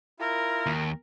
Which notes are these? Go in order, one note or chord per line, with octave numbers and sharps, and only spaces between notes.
E4 F4 A#4
D#2